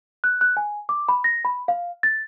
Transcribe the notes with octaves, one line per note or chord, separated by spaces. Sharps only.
F#6
F#6
G#5
D6
B5
A#6
B5
F5
A6